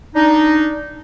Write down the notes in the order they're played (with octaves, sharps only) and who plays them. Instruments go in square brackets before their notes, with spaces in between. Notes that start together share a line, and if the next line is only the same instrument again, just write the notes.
[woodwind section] D4 D#4